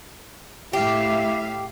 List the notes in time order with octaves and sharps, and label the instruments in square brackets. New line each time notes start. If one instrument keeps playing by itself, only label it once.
[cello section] A2 E5 F5 [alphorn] E4 [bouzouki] G4